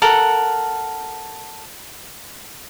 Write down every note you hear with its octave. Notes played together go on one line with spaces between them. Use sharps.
A4 A#4 F#5